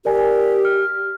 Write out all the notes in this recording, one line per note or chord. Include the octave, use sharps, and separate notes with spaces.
G4 A#4 D5 G#5
F6